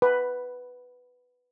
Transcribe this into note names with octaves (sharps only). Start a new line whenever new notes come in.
B4